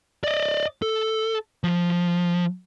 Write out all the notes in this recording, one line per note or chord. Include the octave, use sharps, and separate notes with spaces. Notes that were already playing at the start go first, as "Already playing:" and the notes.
D5 D#5
A4
F3